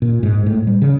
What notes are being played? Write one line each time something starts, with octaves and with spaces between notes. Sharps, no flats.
A#2
G#2
A2
G3
C#3